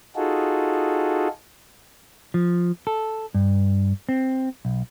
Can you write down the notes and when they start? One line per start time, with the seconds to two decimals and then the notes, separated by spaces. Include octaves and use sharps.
0.16 D#4 F4 F#4 G#4 A4
2.34 F3
2.87 A4
3.34 G2
4.09 C4
4.65 B1